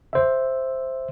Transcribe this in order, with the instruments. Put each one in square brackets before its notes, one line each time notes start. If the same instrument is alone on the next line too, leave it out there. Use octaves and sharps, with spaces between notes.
[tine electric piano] C5 E5